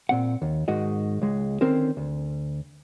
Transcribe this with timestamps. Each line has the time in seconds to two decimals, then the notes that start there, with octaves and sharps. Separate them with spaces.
0.09 A#2 C4 F#5
0.42 D#2
0.68 G#2 D#3 G#3 F#4 D#5
1.22 C#2 G#3
1.61 D3 D#3 C4 C#4 A#4 C5
1.97 D2